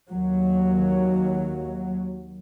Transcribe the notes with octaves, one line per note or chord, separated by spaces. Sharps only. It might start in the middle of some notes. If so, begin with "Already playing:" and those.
D#2 F#3